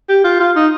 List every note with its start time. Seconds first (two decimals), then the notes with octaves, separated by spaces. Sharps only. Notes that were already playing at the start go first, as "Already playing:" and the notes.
0.09 G4
0.24 F4
0.40 F4
0.56 D#4